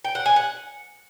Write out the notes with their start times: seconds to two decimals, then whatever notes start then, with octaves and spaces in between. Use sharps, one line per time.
0.05 G5
0.15 F#5
0.26 G#5
0.36 F#5